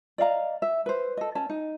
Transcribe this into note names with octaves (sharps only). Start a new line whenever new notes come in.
D5 D#5 F5 A#5
E5
B4 C5
A4 D#5
C#4 A5
D#4